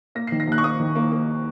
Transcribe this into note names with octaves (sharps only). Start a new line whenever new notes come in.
A#3 A#6
D#3 C7
A#6
D#2 F#6
C#6
A#3 D#6
D#3
A#3
A#3